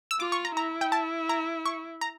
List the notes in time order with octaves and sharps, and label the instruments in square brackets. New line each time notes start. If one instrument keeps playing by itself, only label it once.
[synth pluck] E6
[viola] F4 [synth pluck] D6
[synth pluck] C#6
A#5
[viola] E4 [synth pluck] A#5
[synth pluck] G5
A5
A#5
C#6
A#5